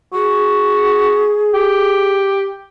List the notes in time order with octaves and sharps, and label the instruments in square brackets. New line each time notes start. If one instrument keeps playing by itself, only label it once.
[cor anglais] F#4 [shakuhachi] G#4
[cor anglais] G4